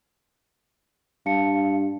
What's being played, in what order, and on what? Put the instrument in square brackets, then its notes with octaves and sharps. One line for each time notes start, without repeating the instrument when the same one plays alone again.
[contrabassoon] G2 [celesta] F5 A5 C#7